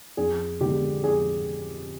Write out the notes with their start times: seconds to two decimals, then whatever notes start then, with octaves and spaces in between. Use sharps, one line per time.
0.17 F2 G#4
0.60 D3 G#3 G4
1.04 F2 G#4